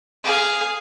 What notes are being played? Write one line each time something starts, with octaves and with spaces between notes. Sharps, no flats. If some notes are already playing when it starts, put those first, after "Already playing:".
G#4 F5